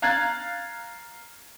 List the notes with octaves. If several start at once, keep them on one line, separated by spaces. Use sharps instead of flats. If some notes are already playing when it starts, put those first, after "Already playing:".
F5 A#5 F#6 G#6 A6